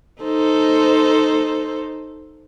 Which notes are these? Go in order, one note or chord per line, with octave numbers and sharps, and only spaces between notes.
D#4 A4 C5